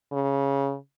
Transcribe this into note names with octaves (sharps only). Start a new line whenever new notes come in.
C#3